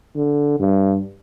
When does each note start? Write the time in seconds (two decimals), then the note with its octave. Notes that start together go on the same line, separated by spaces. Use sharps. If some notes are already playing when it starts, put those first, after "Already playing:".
0.16 D3
0.60 G2